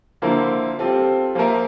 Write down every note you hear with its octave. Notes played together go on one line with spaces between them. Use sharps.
D3 F3 A#3 E4 A#4
G3 C4 F4 A4
F3 A#3 F4 A#4 E5